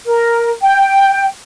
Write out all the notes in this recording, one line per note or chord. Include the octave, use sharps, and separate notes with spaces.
A#4
G5